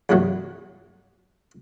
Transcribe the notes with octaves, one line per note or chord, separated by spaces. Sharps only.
E2 G2 C3 F#3 A3